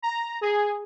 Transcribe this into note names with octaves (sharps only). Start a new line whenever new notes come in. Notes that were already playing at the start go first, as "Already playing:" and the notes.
A#5
G#4